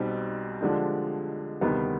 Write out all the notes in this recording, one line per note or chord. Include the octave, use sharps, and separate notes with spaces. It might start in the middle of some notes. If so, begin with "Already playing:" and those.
Already playing: B1 B2 G3 C4 D#4
D3 F3 G#3 D4 G4
D2 C3 D#3 G3 B3